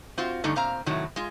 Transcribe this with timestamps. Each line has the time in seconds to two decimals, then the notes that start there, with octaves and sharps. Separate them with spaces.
0.18 C4 F4 F#4
0.44 G2 D3 A3 D#4
0.55 A#2 C4 F5 A#5
0.86 A2 C3 D#3 F#3
1.16 G#3 F4